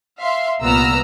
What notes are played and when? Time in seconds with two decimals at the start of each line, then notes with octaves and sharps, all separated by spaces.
0.20 E5 F5 C6
0.62 C2 A#2 B3 A#5 E6 F6